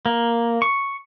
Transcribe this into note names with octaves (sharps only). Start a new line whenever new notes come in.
A#3
C#6